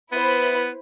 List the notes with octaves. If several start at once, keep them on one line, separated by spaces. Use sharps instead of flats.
B3 E4 B4 C5